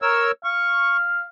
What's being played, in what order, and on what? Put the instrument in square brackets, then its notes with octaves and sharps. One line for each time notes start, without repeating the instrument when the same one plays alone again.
[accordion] A#4 C#5 E6
[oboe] F5 [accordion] C#6